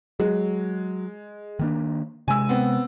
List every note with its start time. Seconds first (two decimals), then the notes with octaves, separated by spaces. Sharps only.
0.20 F#3 G#3
1.59 D#3 A#3 D4
2.28 C3 G#3 G#5 E6
2.49 B3 C4